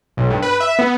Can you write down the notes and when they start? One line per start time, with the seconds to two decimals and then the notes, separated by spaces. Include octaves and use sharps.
0.17 B1
0.31 G2
0.42 B4
0.60 E5
0.79 B3